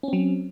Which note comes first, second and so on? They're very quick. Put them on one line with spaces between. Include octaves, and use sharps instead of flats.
C#4 C4 F#3